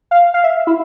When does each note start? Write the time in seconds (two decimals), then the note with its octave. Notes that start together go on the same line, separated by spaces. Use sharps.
0.11 F5
0.34 F5
0.44 E5
0.67 E4